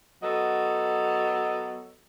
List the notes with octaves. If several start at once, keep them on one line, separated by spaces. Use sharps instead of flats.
F#3 B3 A4 D#5